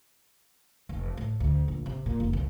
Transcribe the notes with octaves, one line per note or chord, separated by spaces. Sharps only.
F1
A2
D2
A#1
C3
A#2
F1
C2